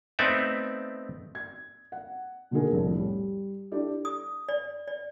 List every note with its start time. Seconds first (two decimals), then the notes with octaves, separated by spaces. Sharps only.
0.19 A3 B3 C4 D#4 D5 E5
1.35 G#6
1.92 F#5
2.51 B2 D3 D#3 F#4 G#4 A#4
2.72 C2 F2 A2
2.96 G3
3.72 D4 E4 G4 A4 D5
4.05 D#6
4.49 D5
4.88 D5